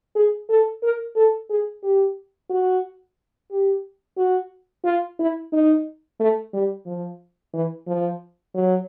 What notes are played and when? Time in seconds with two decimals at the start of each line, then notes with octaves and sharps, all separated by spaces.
0.15 G#4
0.49 A4
0.83 A#4
1.15 A4
1.50 G#4
1.83 G4
2.49 F#4
3.51 G4
4.17 F#4
4.84 F4
5.19 E4
5.52 D#4
6.20 A3
6.53 G3
6.86 F3
7.53 E3
7.87 F3
8.54 F#3